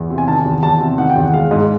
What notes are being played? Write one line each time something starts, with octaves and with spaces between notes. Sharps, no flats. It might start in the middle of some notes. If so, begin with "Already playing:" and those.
Already playing: E2
C3
G#5
D#3 A5
E2
E2 A5
C3
D#3 F#5
G5
E2 F#5
G#3 F5
G#2 D#5